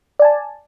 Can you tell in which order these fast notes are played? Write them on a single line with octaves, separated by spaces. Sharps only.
D5 G#5 A5